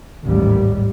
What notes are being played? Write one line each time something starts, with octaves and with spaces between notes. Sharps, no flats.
A1 D#2 G#2 G3